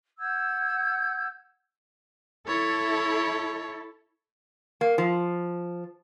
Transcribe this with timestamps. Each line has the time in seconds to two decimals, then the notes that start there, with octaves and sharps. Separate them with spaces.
0.19 F#5 E6 G6 G#6
2.47 E4 A4 C#5
4.81 A#3
4.98 F3